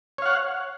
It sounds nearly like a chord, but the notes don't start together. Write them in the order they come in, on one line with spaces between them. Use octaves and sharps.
C#5 F5 F#5